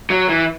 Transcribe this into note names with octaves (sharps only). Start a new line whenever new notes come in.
F#3
E3